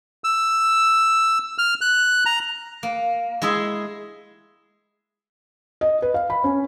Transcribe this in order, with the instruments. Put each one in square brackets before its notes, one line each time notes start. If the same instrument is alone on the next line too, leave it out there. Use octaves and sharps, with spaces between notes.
[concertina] E6
F6
F#6
A#5
[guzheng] A#3
G#3 E4 G#4 E5
[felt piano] D#5
B4
F5
B5
C#4